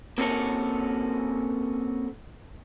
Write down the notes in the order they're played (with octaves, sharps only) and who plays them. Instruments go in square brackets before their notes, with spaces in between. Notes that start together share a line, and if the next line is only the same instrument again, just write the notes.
[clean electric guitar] A#3 C4 C#4 F#4 A4 A#4